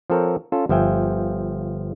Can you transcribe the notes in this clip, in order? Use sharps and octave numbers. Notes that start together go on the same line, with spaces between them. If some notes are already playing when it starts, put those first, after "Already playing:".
F3 C4 A4 A#4 C#5
C#4 F4 A4
G1 F3 E5 G5 G#5